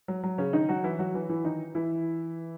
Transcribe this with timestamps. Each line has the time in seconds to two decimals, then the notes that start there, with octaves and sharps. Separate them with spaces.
0.08 F#3
0.23 F#3
0.38 C#3 C#4
0.53 D#3 D#4
0.69 F#3 F#4
0.84 E3 E4
0.99 F#3 F#4
1.14 E3 E4
1.29 E3 E4
1.44 D#3 D#4
1.75 E3 E4